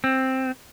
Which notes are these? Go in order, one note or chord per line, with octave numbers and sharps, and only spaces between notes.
C4